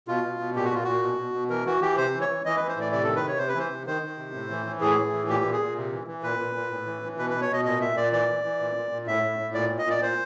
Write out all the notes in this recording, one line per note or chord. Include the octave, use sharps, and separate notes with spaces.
B2 F4
B2
B2
A#2 G4
F#4
A#2 F4
A#2 F#4
B2
B2
B2
E3 A#4
E3 F#4
E3 G4
C3 C5
E3
C#5
E3
E3 D#5
E3 B4
C5
A2 D5
C3 D5
D#3 A4
B4
C3 C#5
C3 C5
B4
E3 C5
C3
D#3 C5
D#3
C3
A2
E3
E3
A2 G#4
A2
E3
A#2 G4
A#2
G#4
A#2
C3
E3
E3
A#2 B4
A#2
A#2
A2
E3
E3
B2 B4
B2 B4
C#5
B2 D#5
A#2 D#5
A#2 E5
A#2 D5
E3 D5
E3
E3
A#2
A#2
A#2
A2 E5
A2
A2
A#2 D5
A#2
D#5
A#2 D5
A#2 C5